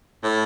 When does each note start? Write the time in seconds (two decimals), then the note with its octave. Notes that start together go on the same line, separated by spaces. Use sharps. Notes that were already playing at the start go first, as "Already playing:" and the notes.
0.24 A2